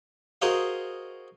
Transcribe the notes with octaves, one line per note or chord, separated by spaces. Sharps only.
F#4 G#4 A#4 C5 D#5 F5